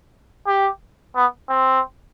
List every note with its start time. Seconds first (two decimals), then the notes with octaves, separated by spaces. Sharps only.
0.47 G4
1.15 B3
1.49 C4